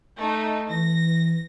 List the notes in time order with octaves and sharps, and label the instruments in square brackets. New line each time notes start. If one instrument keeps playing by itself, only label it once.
[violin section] A3 D#4
[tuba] E3 [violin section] A#6